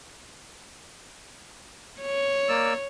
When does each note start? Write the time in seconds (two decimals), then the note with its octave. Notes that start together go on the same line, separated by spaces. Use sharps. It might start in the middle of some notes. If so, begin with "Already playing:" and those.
2.01 C#5
2.49 A#3 D5 E6